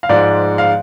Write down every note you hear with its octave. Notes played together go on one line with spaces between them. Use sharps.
F5
G#2 F3 G#3 D5
F5